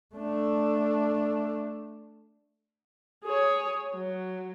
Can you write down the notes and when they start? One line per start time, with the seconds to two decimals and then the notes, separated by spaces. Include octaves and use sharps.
0.15 A3 D4
3.24 G#4 C#5
3.95 F#3